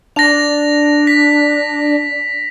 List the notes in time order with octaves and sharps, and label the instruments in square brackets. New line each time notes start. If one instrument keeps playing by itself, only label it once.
[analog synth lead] D4 [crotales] A#6 F7
[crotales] B6